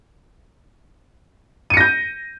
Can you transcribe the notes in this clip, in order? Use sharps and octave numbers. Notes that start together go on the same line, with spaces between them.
G6 A#6 C#7 D#7